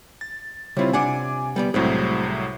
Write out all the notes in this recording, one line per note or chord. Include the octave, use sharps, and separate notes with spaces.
A6
C#3 G3 C4 E4 F4
C3 D4 F#5 G#5 D6
G3 B3 D5
C2 A2 F#3 G#3 C4 G#4